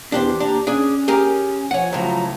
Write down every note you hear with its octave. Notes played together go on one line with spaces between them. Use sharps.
E2 E3 B3 D4 G4 C5
D#2 D4 G4 A#5
C#4 D4 G#4
G4 G#4 A#4
F3 C#5 F#5 G#5
C#2 A2 F3 F#3 A#5